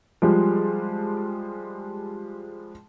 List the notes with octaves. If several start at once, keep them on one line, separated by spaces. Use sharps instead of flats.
F3 G3 G#3